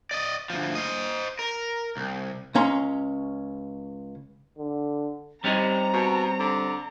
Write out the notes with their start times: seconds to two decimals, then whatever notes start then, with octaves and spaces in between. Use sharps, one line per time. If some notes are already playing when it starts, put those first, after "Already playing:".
0.11 D5 D#5
0.50 D2 F3
0.75 C5 D#5
1.39 A#4
1.97 C2
2.55 C#2 C#4 A#5 C6
4.58 D3
5.44 C3 G3 C4 C#4 D#4 A#5
5.93 B2
6.39 D3